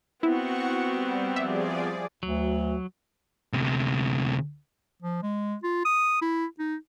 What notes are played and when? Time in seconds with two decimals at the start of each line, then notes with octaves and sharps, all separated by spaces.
0.23 B3 C4 E4 F#4 F#5 C#6
0.85 G3
1.36 F3 G#4 D5 E5
2.23 D2 F#3
3.53 D2 C3
5.02 F3
5.23 G#3
5.63 F4
5.85 D#6
6.21 E4
6.59 D#4